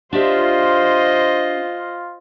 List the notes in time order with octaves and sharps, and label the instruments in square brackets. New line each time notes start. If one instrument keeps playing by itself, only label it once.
[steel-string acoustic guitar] D4 G4 E5 [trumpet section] F4 [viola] C5 D#5